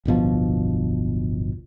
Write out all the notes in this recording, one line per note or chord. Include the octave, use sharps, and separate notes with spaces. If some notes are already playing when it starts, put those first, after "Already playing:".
D1 G1 B2 F3